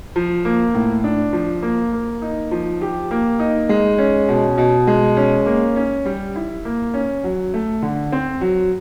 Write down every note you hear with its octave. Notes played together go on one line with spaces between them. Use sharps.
F3
A#3
A2
D4
F3
A#3
A#3
D#4
F3
G4
A#3
D#4
G#3
C#4
B2
B2
G#3
C#4
A#3
C#4
G3
E4
A#3
C#4
F#3
A3
D3
C4
F#3